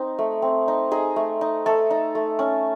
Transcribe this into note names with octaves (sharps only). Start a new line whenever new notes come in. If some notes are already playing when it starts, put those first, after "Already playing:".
Already playing: C4 D#4
A3
C4
D#4
D#4 G#4
A3
D#4
A3 A4
D#4
A3
C#4